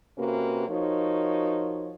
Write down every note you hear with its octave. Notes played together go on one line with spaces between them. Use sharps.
C3 A#3 C#4 F#4 B4
F3 D#4 F#4 A#4 C#5